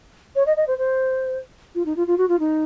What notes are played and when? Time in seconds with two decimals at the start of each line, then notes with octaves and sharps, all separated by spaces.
0.35 C#5
0.46 D#5
0.57 D#5
0.67 C5
0.78 C5
1.75 F4
1.85 D#4
1.96 F4
2.07 F4
2.18 F#4
2.28 F4
2.39 D#4